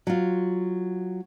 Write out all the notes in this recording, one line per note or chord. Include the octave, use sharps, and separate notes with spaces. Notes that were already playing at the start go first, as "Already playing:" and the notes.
F#3 F4